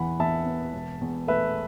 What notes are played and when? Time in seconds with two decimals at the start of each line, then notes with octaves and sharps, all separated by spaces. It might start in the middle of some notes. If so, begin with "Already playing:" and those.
Already playing: E2 E3 F#5 B5
0.19 E2 E5 A5
0.46 B3
0.73 E1
1.01 E2
1.27 A3 B4 E5